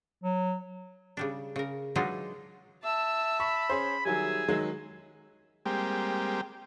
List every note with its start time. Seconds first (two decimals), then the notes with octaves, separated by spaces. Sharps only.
0.24 F#3
1.17 C#3 G3 D4
1.56 C#3 A#4
1.96 E3 F#3 G#3 D4 D#4 F4
2.84 E5 A5
3.40 B5 C#6
3.70 C#4 G#4 C5
4.05 D#3 F#3 G3 G#4 E5 G#5
4.48 D#3 F#3 G#3
5.66 G3 G#3 A#3 C4 G4